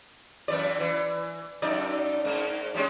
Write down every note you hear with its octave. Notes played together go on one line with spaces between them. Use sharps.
F#2 E3 D5
E3
F#2 D#4 D5
G#2 A#3
G3 G#3 C#4